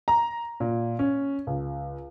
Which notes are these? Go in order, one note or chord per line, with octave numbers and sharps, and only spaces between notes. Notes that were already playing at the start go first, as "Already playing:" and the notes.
A#5
A#2
C#4
C#2